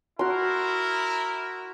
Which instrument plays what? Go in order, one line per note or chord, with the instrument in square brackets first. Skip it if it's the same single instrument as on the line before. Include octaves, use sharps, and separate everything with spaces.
[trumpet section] E4 A#4 [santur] F#4 C6